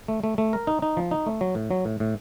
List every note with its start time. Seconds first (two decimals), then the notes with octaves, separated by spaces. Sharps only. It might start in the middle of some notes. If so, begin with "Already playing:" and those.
0.08 A3
0.24 A3
0.38 A3
0.53 A#4
0.67 D#4
0.82 D#4
0.97 F3
1.11 D#4
1.26 A3
1.41 F#3
1.55 A2
1.71 F#3
1.85 A2
2.00 A2